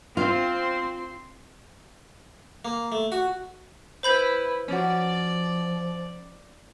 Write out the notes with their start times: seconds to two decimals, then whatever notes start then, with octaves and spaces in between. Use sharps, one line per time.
0.17 C4 F4 C6
2.65 A#3
2.92 A3
3.12 F#4
4.03 E4 B4 C5 B5 G6
4.68 F3 C#4 F#4 D5